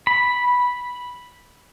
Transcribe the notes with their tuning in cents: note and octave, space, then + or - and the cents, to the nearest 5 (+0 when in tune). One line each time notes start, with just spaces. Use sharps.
B5 -5